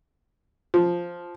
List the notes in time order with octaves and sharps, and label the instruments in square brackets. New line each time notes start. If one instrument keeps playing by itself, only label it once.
[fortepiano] F3